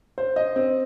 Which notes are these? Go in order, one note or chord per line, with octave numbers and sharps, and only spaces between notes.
C5
D#5
C4